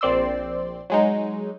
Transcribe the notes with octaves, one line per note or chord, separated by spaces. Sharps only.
A#1 C4 D5 C6 E6
F#3 G#3 D#4